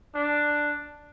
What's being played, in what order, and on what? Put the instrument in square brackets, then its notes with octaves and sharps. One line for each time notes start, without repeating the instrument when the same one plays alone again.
[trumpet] D4